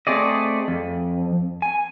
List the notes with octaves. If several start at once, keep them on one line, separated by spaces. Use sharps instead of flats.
A3 C4 G#4 D5 D#5
F2
G#5